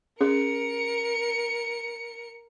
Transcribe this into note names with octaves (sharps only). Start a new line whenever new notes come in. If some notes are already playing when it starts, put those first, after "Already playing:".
C#4 G#4 A#4 C#7